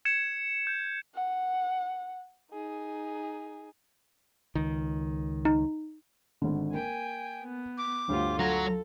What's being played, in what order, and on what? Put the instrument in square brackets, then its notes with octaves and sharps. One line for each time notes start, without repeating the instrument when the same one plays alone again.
[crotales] G#6 C#7 E7
G6
[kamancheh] F#5
D#4 G#4
[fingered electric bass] C#2 D#3
[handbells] D#4
[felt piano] G#1 D3
[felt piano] A#3 [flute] G5 [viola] G#5
[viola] B3
[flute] D6
[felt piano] G1 D2 [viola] F4 G4
[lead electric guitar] F#3 F#4 [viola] A4 [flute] A#5